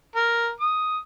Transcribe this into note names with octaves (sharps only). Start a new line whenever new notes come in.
A#4
D#6